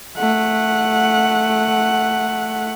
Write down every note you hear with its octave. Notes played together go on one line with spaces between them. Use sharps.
A3 F#5